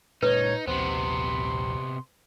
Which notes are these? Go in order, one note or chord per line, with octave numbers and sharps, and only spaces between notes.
A#2 G#3 C#4 D#4 B4 C#5
D#1 A#1 C3 B3 C5 C6